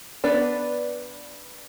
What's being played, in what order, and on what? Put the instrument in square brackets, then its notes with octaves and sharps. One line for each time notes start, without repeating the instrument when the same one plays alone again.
[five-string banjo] B3 D4 B4 D5